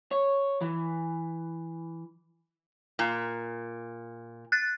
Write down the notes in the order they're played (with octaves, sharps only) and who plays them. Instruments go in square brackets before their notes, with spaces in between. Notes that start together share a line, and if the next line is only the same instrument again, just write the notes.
[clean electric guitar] C#5
E3
[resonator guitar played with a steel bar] A#2
[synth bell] F#6 A6